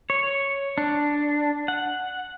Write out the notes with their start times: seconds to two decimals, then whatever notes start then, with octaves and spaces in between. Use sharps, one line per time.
0.10 C#5
0.78 D4
1.68 F#5